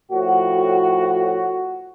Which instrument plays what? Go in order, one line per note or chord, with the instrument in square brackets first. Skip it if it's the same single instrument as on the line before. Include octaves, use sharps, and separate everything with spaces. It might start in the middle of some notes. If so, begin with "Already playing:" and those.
[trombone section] A2 F3 F#4